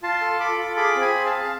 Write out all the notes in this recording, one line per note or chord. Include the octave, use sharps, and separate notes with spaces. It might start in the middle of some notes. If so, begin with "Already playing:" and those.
F4 A5 C6
A4
A4 B5 D6
F4
G#4 B5 D6
C4
G#5 B5
G#4
F5 A5
G#4
F5